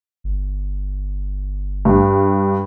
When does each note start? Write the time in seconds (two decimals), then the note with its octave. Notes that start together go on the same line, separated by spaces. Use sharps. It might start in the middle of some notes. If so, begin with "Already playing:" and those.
0.24 G1
1.85 G2